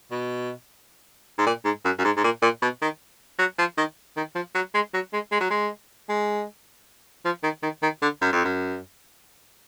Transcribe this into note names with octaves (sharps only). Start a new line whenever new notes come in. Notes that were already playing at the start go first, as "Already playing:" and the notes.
B2
G#2
A#2
G#2
F#2
F#2
G#2
G#2
A#2
A#2
B2
D#3
F#3
F3
D#3
D#3
F3
F#3
G#3
F#3
G#3
G#3
F#3
G#3
G#3
F3
D#3
D#3
D#3
D3
F#2
F2
F#2